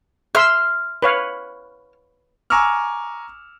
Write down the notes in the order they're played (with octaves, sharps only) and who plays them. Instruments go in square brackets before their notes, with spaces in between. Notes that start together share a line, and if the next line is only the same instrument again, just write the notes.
[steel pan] E5 C6 E6 [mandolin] F6
[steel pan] B4 C#5 F5
[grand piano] G#5 A#5 C#6 D6 E6 F6